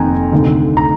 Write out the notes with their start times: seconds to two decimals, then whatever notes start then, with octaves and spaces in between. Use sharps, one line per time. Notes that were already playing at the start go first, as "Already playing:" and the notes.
Already playing: F1 F2 D#3 A#3 G5 G#5 A#5
0.32 D2 C3 D#3
0.77 A#5